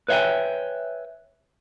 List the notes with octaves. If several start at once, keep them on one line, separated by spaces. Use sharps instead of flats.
B4 C#5 E5 F5 G5 G#5